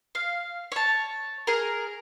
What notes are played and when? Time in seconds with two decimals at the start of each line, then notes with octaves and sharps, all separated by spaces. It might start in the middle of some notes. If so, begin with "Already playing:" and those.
0.15 F5
0.72 C#5 A5
1.47 G#4 A#4